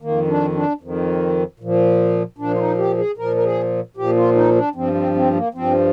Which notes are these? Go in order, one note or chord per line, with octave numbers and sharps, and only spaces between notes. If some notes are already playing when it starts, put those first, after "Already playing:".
F2 D#3 A#3
D4
D4
F2 D#3
A#2 F3
A#2 F3 D4
F4
D#4
G4
G#4
A#2 F3 A#4
A#4
G#4
A#2 F3 G4
F4
D#4
D4
G2 F3 C4
C4
C4
A#3
G2 F3 C4